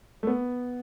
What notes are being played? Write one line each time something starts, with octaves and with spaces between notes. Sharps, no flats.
A3
B3